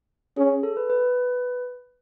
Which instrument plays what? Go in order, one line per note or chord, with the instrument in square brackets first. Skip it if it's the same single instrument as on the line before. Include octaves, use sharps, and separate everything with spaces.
[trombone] C#4 [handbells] G#4
[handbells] A4
B4
B4